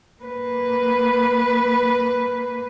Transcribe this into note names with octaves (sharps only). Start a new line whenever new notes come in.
A#3 B4